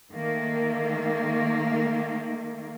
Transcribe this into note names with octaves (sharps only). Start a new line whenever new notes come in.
D#3 A3 A#3